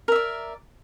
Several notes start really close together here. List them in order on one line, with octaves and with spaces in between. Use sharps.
A#4 E5 D5